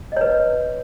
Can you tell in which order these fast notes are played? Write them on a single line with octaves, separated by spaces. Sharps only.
D#5 C#5 B4